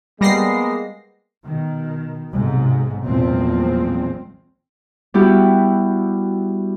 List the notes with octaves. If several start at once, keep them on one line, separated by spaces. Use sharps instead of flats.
G3 G#3 A#3 B3 A#6 C7
B2 D#3
B1 G#2 C3
B1 E2 A#2 F3 G#3 C4
G3 B3 E4 F#4 G4